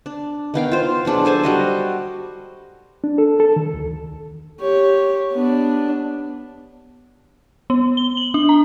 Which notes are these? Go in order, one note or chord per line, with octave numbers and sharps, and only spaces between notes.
D4
D#3 B3 F5 G5
F4 C5
B2 F#3 D4 G#4
A4 C5 G#5 A5
G3 F#4 D#5
D4
A4
A4
D#3
D2
G4 C#5
B3 D4
B3
G7
F#7
D4
A#5